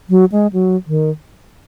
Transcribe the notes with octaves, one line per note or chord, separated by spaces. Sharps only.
F#3
G#3
F#3
D#3